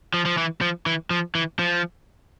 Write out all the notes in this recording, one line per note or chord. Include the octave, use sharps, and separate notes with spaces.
F3
F3
E3
F3
E3
F3
E3
F3